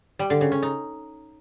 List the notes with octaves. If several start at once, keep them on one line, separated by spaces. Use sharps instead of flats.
G3
D3
C#3
C#4
D#4